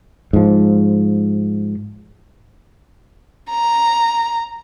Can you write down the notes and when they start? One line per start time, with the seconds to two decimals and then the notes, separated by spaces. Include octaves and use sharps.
0.33 G#2 F3
3.50 A#5